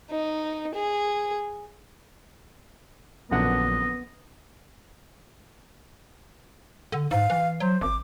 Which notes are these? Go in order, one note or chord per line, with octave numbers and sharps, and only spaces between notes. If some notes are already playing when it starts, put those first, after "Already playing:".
D#4
G#4
A#1 F#2 D3 B3 D#5 F#5
D3
G#2 F5
E3
F#3 C5
G#1 D6